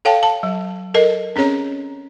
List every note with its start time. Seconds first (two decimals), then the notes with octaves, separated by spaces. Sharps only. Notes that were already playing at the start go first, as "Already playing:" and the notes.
0.05 A4 C#5 F5 G5 A5
0.23 A5
0.43 F#3
0.94 A4 A#4 D#5
1.36 C4 C#4 G#4 C#5 A#5